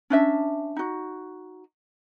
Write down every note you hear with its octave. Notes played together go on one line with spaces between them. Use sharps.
C#4 D4 E5
D#4 F#4